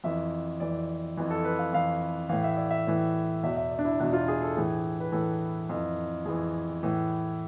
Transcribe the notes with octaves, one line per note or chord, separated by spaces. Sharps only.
F2 E3 E5
F2 E3 D5
F2 E3
A4
B4
F5
F2 E3 F5
A2 E3 F5
E5
D5
E5
A2 E3
E2 B2 E5
E5
D5
D4
E4
E2 B2 D4
F4
G#4
A4
A2 E3 G#4
B4
A2 E3 A4
F2 E3
F2 E3 G#4
A2 E3